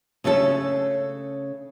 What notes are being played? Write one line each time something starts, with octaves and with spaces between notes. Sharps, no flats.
C#3 A3 C#4 A4